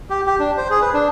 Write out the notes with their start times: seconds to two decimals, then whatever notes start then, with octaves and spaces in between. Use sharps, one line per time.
0.10 G4
0.26 G4
0.39 D4
0.57 C5
0.70 G#4
0.82 B4
0.94 D4